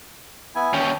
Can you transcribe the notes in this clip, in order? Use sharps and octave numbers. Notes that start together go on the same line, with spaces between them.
B3 E4 G#5
D#2 C#4 G5